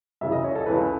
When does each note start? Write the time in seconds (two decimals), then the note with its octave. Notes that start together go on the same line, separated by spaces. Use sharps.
0.21 F#2 C#3 E3 E5
0.32 D#5
0.44 C#5
0.55 A4
0.66 C#2 C#3 E3 B4